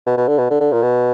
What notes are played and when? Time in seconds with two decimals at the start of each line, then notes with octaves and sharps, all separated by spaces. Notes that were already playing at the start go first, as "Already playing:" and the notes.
0.06 B2
0.17 B2
0.28 D3
0.39 B2
0.50 D3
0.60 D3
0.72 A#2
0.83 B2